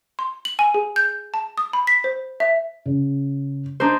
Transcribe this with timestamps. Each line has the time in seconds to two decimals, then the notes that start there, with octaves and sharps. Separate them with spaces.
0.19 C6
0.45 F#7
0.59 G#5
0.74 G#4
0.96 G6
1.34 A5
1.58 D#6
1.73 B5
1.87 B6
2.04 C5
2.40 E5
2.86 C#3
3.80 D4 D#4 C5